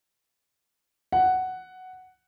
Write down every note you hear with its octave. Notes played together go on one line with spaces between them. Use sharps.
F#5